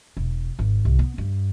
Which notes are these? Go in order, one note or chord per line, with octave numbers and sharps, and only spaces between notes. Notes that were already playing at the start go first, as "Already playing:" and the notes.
E1
G#1
C2
B3
G2